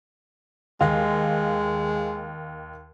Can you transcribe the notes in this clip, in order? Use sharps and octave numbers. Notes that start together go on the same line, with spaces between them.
D#2 G#3 F5